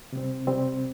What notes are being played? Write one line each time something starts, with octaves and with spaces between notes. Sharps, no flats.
C3 G3 C4
C3 G3 C4